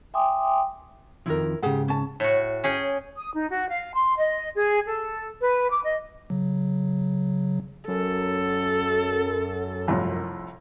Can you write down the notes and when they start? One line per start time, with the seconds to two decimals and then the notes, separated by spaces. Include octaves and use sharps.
0.14 E5 G5 G#5 C6 D6 D#6
1.26 F2 D#3 F3 E4 A#4
1.62 G#2 C#3 G4 G#4 F#5
1.88 C#4 A5
2.20 A2 F#4
2.64 C#4 G#4 G5
3.18 D#6
3.34 D#4
3.49 F#4
3.69 F5
3.94 C6
4.17 D#5
4.55 G#4
4.86 A4
5.41 B4
5.71 D6
5.83 D#5
6.30 C#3 F#3
7.88 F#2 A4
9.88 C2 F2 A2